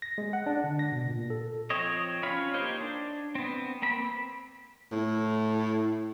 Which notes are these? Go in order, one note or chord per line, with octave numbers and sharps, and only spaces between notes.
A#6
G#3
F#5
D4
D3
A#6
B2
A#2
A4
F3 C4 C#5 D#5
C#4 F4 C#5 F5 B5
A#3 D#4 G4 C5 C#5
D4
B3 C4
A#3 C4 B5
A2